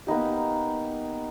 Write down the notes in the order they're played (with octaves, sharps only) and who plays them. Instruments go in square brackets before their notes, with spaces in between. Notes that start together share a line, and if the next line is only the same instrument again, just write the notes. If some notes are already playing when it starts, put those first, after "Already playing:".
[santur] A#3 B3 D#4 G4